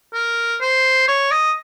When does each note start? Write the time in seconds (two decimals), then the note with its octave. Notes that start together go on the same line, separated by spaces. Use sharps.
0.14 A#4
0.61 C5
1.08 C#5
1.31 D#5